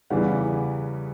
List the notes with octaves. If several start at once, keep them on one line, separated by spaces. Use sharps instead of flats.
E2 C#3 E3 G3 F#5